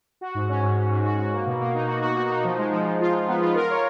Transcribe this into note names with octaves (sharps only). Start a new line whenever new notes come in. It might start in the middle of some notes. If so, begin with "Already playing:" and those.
F#4
G#2
C#4
G#2
C#4
G#2
F#4
F#4
A#3
B2
A#3
D#4
F#4
F#4
F#4
D#4
F3
G#3
F3
F3
F4
F4
B3
F4
A#4
C#5